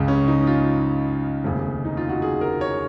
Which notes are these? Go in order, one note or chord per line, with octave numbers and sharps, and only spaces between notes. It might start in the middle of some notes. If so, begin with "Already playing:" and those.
Already playing: C#2 C#3
C#4
D#4
F4
F1 D#2 C#3
D#4
F4
F#4
G#4
A#4
C#5